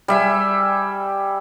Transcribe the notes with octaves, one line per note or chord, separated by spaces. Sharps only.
G3 E5 G#5